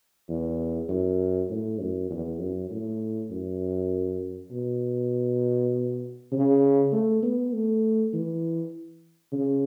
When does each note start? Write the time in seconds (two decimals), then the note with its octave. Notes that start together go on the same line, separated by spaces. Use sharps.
0.29 E2
0.89 F#2
1.50 A2
1.80 F#2
2.10 E2
2.39 F#2
2.70 A2
3.31 F#2
4.51 B2
6.32 C#3
6.92 A3
7.23 B3
7.53 A3
8.13 E3
9.33 C#3